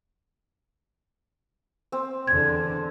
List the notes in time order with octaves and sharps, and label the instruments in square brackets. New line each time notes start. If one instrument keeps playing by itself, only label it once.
[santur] C4
[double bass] E2 D3 [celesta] G#6